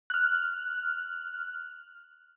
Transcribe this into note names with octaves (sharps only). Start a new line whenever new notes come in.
F6 F#6